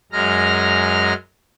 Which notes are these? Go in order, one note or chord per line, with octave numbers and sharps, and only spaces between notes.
F#2 G#3 A#5 F6